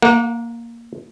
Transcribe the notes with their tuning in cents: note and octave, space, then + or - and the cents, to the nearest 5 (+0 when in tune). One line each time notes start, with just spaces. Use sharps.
A#3 +0 F#5 -35